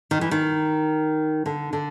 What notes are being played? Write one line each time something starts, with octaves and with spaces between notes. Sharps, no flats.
D#3
E3
D#3
D3
D3